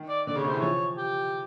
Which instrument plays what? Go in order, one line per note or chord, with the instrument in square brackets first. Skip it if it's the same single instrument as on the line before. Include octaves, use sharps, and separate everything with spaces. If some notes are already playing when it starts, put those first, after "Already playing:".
Already playing: [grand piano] D#3
[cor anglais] D5
[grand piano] D3 [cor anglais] D5
[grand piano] C#3 [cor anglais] C#5
[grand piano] C3
[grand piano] E3 [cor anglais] C5
[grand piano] F3 [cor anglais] C#5
[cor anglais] G4